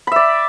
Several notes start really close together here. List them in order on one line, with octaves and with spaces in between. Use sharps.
B5 E5 D5